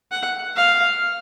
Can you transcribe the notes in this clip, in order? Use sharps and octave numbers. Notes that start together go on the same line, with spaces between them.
F#5
F5